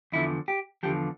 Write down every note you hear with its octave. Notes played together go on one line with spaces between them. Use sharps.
E2 D3 F3 E4
G4
E2 D3 F3 G4